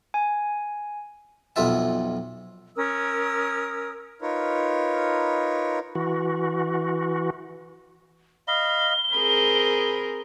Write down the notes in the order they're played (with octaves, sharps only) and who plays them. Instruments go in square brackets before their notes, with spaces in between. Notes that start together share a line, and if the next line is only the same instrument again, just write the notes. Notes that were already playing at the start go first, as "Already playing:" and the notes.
[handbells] G#5
[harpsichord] B1 F2 F4 E5 A5
[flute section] C#4 A#4 D#6 E6
[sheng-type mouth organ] D#4 F4 A#4 B4 C#5
[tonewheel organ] E3 F#4
[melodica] D#5 F5 B5 [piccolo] G7
[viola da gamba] C4 G#4 A#4 [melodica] B5